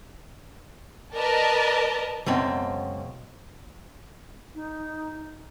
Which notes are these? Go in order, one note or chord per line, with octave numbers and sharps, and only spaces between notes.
A#4 B4 D5 D#5 A5 A#5
C#2 F#2 B2 C4
D#4